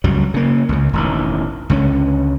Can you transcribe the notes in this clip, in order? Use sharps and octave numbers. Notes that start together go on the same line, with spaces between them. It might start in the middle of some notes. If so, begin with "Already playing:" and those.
C#2 F#2 F#3 G3
C#3 A#3
C#2 C#3
E1 A1 D#3
C#2 D3 F#3 C#4